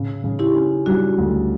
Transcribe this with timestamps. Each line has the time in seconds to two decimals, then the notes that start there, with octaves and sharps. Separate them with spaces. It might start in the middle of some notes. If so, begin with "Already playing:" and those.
Already playing: C#3
0.24 C#3
0.39 E4 G4
0.55 C#4
0.86 G3 D4 F#4
1.18 D2